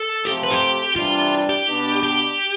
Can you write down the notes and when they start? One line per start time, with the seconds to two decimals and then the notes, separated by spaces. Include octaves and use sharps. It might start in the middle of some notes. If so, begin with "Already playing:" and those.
Already playing: A4
0.25 C3 F3 A3 C4 G4
0.43 B4
0.51 G4
0.96 C3 E3 G3 D4 F4
1.49 G4
1.67 B2 B3 D4
2.03 G4